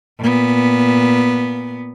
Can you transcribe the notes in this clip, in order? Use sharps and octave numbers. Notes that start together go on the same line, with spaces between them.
A#2 B3